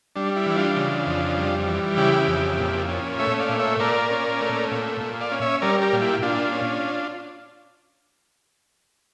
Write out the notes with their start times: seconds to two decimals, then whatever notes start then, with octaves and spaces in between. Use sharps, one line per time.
0.15 G3 D4
0.36 E4
0.46 E3 E4
0.56 D4 F4
0.76 C#3
1.07 F2
1.36 G3
1.67 E3
1.97 C#3 E4 G4
2.27 F2
2.58 A#2
2.88 C#4
3.19 A3 C#5 E5
3.39 D5 F5
3.49 A#2
3.59 C#5 E5
3.79 A#2 A#4 D5
4.10 C#4
4.41 A3
4.71 A#2
5.01 A#2
5.21 D5 F5
5.32 C#4
5.42 C#5 E5
5.62 G3 A#4 D5
5.82 G4 A#4
5.93 A#2
6.02 E4 G4
6.22 A#2 D4 F4
6.53 C#4